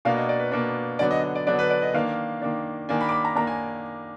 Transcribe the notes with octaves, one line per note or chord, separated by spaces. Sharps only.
B2 A#3 D4 F5
D#5
D5
B4
B2 A#3 D4
D3 F#3 B3 D4 D5
D#5
D#5
D5
D3 F#3 B3 D4 D5
B4
D5
D#5
D#3 A#3 D4 F5
D#3 A#3 D4
D#3 A#3 D4 G#5
B5
D6
B5
A#5
D#3 A#3 D4 A#5
G#5